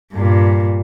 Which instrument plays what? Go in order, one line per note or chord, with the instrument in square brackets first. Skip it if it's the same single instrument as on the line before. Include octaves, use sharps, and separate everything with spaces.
[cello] G2 A#2